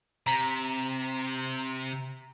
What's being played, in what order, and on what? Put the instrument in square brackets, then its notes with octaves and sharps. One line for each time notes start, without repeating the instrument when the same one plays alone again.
[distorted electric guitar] C3 [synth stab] A#5 B6